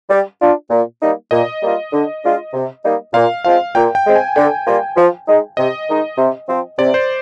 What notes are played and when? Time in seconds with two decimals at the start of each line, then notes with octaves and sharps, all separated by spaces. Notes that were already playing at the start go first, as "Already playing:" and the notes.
0.10 G3
0.41 D4 F4
0.70 A#2
1.00 G3 A#3 D#4
1.31 A#2 D#5
1.62 G3 A#3 F4
1.92 D3
2.23 G#3 D4 F4
2.54 C3
2.83 G3 A#3 D#4
3.14 A#2 F5
3.44 F3 G#3 C4 F4 F5
3.75 A#2 G5
3.95 G5
4.05 G#3 C4
4.15 G#5
4.36 D3 G5
4.67 G3 A#3 F4
4.96 F3
5.28 G#3 D#4
5.57 C3 D#5
5.87 D#3 G#3 D#4
6.18 C3
6.48 F3 C4
6.79 C3 D5
6.94 C5